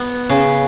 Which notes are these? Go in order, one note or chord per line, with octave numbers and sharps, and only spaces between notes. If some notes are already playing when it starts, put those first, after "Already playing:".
Already playing: B3
C#3